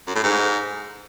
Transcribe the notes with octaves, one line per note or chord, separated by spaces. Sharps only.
F#2
A2
G#2